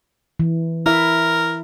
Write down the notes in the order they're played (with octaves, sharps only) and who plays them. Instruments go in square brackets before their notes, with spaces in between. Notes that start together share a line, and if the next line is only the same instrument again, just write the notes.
[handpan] E3
[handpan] E4 E5 [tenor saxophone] A#4